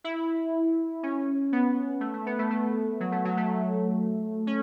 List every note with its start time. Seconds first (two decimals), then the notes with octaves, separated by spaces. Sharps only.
0.04 E4
1.03 C#4
1.52 B3
2.01 A3
2.14 A3
2.26 B3
2.39 A3
2.51 A3
3.00 F#3
3.12 A3
3.25 F#3
3.37 A3
4.47 C#4